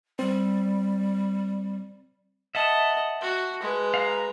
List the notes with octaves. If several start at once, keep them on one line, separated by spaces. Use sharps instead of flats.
G3 C4
D#5 E5 F#5 A5
F#4
G#3 B4
F5 A#5